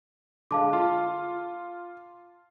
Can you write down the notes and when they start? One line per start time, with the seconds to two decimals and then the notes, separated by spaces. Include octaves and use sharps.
0.51 D3 G#3 F5 A5 D6
0.73 F4